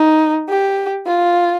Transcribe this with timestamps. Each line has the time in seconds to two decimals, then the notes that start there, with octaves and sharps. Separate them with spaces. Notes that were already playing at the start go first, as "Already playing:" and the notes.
Already playing: D#4
0.49 G4
1.06 F4